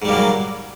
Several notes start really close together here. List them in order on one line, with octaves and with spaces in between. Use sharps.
G#2 G3 A#3 F#3